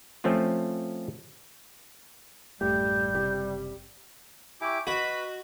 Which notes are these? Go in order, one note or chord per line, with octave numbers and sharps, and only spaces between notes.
F3 A3 C4 C#4 F4
A1 F#2 G3 A3 G4 G6
F#1 C3 G4
E4 G4 G#5 C#6 D6
F#4 B4 D#5 B5